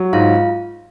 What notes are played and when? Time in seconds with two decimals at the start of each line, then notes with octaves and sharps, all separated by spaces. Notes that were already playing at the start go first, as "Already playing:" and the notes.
Already playing: F#3
0.13 G#2 F4 F5